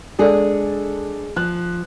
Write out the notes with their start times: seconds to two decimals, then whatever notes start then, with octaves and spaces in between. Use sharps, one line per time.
0.19 G#3 D4 G#4 A4 D5
1.36 F3 F#6